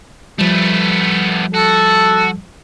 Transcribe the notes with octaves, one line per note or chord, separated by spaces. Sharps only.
F3 G3 A3 B3
F#4 A4